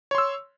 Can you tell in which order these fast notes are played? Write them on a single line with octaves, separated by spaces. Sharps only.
C#5 C6 E6